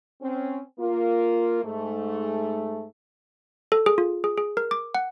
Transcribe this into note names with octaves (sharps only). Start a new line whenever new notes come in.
C4 C#4
A#3 F4
G#2 A3
A4
G#4
F4
G#4
G#4
A#4
D6
F#5